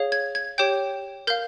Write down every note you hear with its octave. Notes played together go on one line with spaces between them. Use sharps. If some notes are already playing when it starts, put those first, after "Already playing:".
Already playing: G#4 C#5 F5
G#6
G#6
G4 C#5 G5 G6
A#4 F5 G6